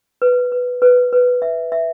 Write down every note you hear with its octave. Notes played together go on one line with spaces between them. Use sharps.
B4
B4
B4
B4
E5
E5